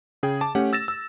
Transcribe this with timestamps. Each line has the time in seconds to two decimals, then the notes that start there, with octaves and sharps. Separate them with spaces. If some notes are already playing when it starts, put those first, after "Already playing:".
0.23 C#3 G#4 G5
0.41 A5 D6
0.55 A3 C#4 G4 F#5
0.73 E6 A6 A#6 E7
0.88 E6